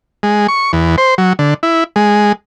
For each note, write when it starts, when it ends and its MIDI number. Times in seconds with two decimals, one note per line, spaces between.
0.23 0.47 56
0.48 0.72 85
0.73 0.96 40
0.98 1.15 72
1.18 1.33 54
1.39 1.54 50
1.63 1.84 64
1.96 2.32 56